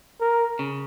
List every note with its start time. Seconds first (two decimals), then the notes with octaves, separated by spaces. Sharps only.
0.21 A#4
0.59 C#3